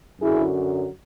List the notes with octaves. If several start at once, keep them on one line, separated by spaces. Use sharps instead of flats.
F#2 D3 F#3 E4 G#4